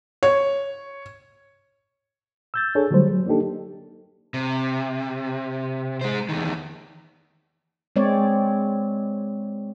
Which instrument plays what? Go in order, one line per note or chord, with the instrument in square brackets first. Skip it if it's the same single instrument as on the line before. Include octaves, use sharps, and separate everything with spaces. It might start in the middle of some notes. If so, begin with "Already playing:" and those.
[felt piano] C#5
[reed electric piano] E6 G6 A6
D4 G#4 A4 C#5
D3 F#3 G3 A3 C5
F#3
A#3 D4 D#4 G4 A4
[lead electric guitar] C3
G#3 C5
E2 D#3
[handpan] G#3 C4 C#5 D5